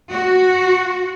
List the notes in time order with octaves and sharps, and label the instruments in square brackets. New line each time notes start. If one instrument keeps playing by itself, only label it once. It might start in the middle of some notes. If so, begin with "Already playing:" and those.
[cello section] F#4